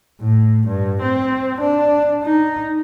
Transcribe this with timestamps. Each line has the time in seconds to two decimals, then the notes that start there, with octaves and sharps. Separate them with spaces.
0.21 A2
0.67 G2
1.02 C4
1.61 D4
2.24 D#4